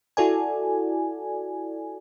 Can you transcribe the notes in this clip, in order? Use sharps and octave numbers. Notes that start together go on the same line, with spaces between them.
E4 F#4 A4 D5 G#5